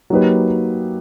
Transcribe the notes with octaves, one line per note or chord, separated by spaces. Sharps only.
F#3 A#3 D#4 G4 B4